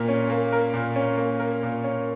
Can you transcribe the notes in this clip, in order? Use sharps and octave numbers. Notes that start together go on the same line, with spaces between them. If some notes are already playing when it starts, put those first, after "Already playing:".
Already playing: A#2 A#3 A#4
C#4
A#3
A#4
A#2
C#4
A#3
A#4
A#2
C#4